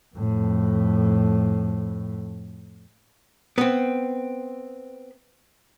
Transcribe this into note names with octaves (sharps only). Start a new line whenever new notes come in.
F2 A2
B3 C4